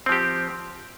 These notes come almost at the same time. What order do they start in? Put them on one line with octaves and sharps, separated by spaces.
C4 F3 G4